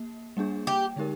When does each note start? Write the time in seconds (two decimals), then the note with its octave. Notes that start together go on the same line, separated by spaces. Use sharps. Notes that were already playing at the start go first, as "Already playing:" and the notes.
Already playing: A#3
0.37 G3 A#3 D4 G#4
0.67 G4
0.96 D3 G#3 D#4 G4 A#4